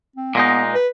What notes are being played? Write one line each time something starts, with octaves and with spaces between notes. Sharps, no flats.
C4
A#2 G#3 B3 D#4
B4